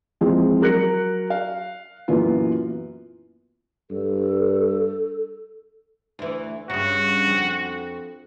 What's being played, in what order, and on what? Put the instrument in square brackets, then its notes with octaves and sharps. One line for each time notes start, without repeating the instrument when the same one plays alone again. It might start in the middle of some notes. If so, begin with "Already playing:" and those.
[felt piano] E3 F3 G#3 C4 F4
F#3 A#4 F#6 A#6 C#7
F5
F#2 A#2 E3 B3 F4
[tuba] G2 [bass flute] A4
[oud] D2 E3
[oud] G2 C#3 [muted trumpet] F#4
[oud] F2